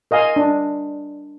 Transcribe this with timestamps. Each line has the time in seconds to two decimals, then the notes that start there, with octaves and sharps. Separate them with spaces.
0.11 A#4 D#5 F5 G#5
0.36 D4